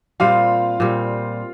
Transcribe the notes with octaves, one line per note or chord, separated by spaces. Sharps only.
A#2 G3 C4 F4 F5
A#2 G3 C4